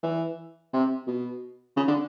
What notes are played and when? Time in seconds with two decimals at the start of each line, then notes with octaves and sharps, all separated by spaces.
0.03 E3
0.73 C3
1.07 B2
1.77 C#3
1.88 D3